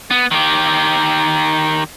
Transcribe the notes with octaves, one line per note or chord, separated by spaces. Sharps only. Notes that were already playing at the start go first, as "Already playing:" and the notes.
B3
D#3 G4